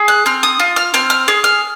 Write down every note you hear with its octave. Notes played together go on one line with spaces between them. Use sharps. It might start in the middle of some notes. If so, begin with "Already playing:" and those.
Already playing: G#4
F#6
C4 F6
D#6
F4
F6
C4 F6
F6
G#4 F6
F6